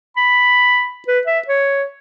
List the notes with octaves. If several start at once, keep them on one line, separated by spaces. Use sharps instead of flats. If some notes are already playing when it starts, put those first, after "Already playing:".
B5
B4
E5
C#5